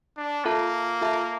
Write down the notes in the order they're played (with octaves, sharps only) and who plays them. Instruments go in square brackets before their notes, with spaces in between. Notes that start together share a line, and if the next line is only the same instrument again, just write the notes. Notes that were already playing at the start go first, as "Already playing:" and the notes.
[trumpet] D4
[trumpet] A#3 [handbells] F4 A4 E5 A5
[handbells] F4 A4 E5 A5